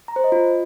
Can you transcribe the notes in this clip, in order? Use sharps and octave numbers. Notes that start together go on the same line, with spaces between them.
A#5
C5
D#5
F4